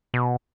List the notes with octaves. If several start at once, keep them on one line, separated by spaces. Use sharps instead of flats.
B2